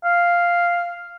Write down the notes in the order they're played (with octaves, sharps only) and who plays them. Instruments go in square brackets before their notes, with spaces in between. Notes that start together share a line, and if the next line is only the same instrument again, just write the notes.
[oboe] F5